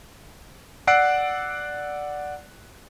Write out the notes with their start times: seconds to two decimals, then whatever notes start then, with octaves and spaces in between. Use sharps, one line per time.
0.87 D5 F#5 E6 F#6 C7 D7